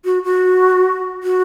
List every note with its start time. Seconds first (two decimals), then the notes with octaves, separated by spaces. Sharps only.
0.05 F#4
0.24 F#4
1.23 F#4